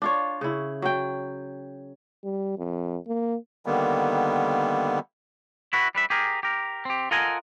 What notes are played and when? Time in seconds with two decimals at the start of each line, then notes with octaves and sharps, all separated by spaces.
0.02 D4 F4 C#5
0.41 C#3 E4
0.82 F#3 G5
2.24 G3
2.58 F2
3.08 A#3
3.66 D3 D#3 G3 A#3 B3
5.73 E4 F#4 B4
5.95 G3 B4 E5
6.10 G4 G#4 A#4
6.43 G4 A#4
6.85 C4 G4
7.11 F4 A4 A#4 D#5 F#5 G#5